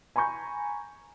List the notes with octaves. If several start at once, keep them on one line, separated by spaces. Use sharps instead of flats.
G#5 A#5 B5 C#6 G6